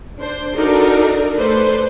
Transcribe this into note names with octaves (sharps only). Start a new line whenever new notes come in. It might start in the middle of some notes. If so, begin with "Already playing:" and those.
D4 C5
D4 D#4 F#4 A4 A#4 D5
A3 A4 B4 C5 D5